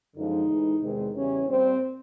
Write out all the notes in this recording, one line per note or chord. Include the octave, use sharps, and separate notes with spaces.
F#2 D3 F3 G#3 D#4
A2 E3 G#3
E2 C3 D#3 G#3
E2 C#3 E3 G3 C#4
A#2 G3 C4